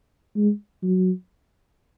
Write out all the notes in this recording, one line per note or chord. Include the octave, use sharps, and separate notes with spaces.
G#3
F#3